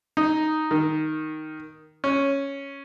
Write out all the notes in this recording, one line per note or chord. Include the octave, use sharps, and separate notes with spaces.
D#4
D#3
C#4